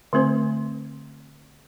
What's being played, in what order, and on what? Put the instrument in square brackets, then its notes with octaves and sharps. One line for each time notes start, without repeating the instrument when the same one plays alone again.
[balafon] D3 A3 C4 C5